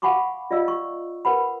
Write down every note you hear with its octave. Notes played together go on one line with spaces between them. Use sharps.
F5 F#5 G#5 B5 C#6 D6
F4 D5 D#5 F5 E6
C#6
A#4 B4 F#5 B5